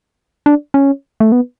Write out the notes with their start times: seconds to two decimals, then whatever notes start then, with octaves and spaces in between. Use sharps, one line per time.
0.46 D4
0.74 C#4
1.20 A3
1.32 B3